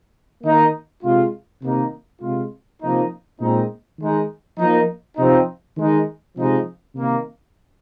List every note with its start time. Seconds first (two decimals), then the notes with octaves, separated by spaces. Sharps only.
0.43 D#3 A#3 D#4
1.02 C3 G#3 F4
1.61 C3 D#3 A#3 D#4
2.21 C3 G#3 F4
2.81 C3 F3 A#3 D#4
3.40 A#2 G#3 C4 D#4
3.98 D#3 G#3 D#4
4.58 F3 A#3 D#4
5.16 C3 F3 C4 D#4
5.77 D#3 G#3 D#4
6.36 C3 F3 G#3 D#4
6.94 C3 D#3 A#3